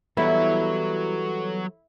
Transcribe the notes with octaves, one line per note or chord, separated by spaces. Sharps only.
E3 F#3 G3 B3 E4 A4 C#5